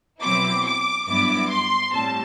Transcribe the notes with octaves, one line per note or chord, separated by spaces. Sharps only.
B2 F#3 C4 E4 D6
D6
G2 F#3 B3 E4 D6
C6
A2 G3 C4 A5